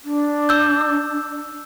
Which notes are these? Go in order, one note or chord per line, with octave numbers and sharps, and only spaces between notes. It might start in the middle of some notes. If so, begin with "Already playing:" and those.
D4
E6 G6